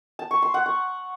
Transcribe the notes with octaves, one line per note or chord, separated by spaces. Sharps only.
A5
C#6
C6
F#5
C#6